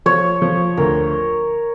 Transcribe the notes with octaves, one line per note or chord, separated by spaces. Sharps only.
F3 C#5
F3
D2 A#4